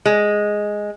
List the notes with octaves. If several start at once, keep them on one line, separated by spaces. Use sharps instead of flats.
G#3